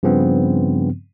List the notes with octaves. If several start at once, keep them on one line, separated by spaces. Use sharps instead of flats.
G2 C#3 F3 B3 C4